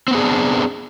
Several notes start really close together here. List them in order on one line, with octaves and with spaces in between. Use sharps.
C4 B3 G#4 D4